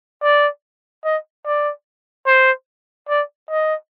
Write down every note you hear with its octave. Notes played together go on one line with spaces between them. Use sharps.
D5
D#5
D5
C5
D5
D#5